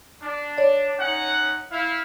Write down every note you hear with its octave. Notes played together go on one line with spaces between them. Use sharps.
D4
C#5 D5
C#4 D#4 F#5
E4 F5